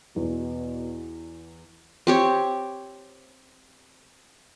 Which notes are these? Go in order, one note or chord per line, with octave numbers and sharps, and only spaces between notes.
E2 B2
C4 G4 C#5